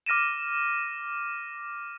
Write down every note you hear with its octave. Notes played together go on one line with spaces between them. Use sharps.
D6 F6 A#6 D#7 E7